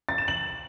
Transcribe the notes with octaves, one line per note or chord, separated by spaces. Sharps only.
A6
E7
F#7